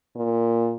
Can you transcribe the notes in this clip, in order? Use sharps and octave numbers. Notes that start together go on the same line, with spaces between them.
A#2